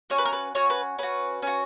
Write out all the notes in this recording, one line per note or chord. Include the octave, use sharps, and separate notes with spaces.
C#4 F#4 C#5
B4
A#4
B4
C#4 F#4 C#5
B4
C#4 F#4 B4
C#4 F#4